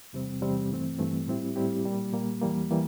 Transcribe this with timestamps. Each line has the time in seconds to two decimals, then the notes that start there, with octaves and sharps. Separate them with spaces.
0.13 E2 C3 G3 C4
0.41 E2 C3 G3 C4
0.70 G2 E3 A3 C4
0.99 G2 E3 A3 C4
1.27 A2 G3 C4 E4 G4
1.56 A2 G3 C4 E4 G4
1.84 A#2 G3 A#3
2.13 A#2 G3 A#3
2.42 E2 E3 G3 A#3
2.70 E3 G3 A#3